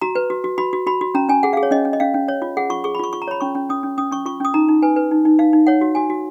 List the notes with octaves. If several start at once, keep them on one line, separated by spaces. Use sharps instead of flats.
F#4 A#5
B4
F#4
F#4
F#4 B5
F#4
F#4 B5
F#4
C#4 A#5
C#4 G#5
G#4 F#5
F5
G#4
C#5
C#4 D#5
C#4
D#5
C#4 F5
C#4
C#5
F4
G#4 F#5
F4 C#6
G#4 C#6
B5
F4 C#6
F4 C#6
A#5
C#5 B5
C#4 C#6
C#4
C#4 D#6
C#4
C#4 D#6
C#4 C#6
F4 C#6
C#4 D#6
D#4 A#5
D#4
B4 G#5
B4
D#4
D#4
D#4 F5
D#4
C#5 F#5
F#4
F#4 G#5
F#4